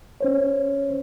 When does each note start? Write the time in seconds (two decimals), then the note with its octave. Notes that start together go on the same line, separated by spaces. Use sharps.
0.21 C#4 C5 C#5